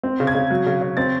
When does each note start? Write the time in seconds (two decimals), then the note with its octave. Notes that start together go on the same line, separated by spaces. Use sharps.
0.03 C4
0.20 C#3
0.27 G#6
0.35 C#3
0.50 F#3
0.66 C#3
0.81 C#3
0.97 C4 A6